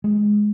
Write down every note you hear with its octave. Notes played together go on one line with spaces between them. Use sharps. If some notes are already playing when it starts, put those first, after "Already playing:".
G#3